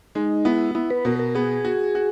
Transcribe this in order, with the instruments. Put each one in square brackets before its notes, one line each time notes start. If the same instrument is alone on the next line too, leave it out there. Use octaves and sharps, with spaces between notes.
[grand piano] G#3 [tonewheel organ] D#4
[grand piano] B3 [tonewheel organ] E4
[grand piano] B3 [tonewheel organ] E4
[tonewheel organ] B4
[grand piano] B2 [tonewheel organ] A#4
[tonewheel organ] A#4
[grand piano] B3 [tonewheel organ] G#4
[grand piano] F#4
F#4